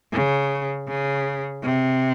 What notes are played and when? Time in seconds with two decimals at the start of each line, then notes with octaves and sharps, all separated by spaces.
0.13 C#3
0.88 C#3
1.63 C3